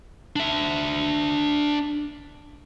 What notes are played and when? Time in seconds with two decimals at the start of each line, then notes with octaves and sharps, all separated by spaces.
0.36 D4 E5